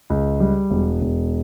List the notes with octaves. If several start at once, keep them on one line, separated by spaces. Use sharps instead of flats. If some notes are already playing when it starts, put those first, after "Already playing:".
C#2
G3
E1
E1